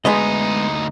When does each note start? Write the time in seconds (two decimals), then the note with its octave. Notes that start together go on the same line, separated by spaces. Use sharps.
0.05 D2 G#3 B3 D#4 D#5